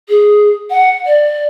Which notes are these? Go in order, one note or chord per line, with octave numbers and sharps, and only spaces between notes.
G#4
F#5
D5